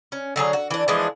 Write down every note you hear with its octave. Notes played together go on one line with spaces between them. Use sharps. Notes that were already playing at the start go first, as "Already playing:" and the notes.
C#4
D3 F#3 G#4 A#5
F#4
E3 D4
E3 F3 G#3 D4